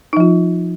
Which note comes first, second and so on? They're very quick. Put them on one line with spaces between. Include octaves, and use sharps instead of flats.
D#4 F3 F4